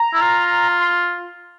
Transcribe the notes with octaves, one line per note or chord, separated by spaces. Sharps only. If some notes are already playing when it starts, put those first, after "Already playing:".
Already playing: A#5
E4
F4
C6